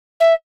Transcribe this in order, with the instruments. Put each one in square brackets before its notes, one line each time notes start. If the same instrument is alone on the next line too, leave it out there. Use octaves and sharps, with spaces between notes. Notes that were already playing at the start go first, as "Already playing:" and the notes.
[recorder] E5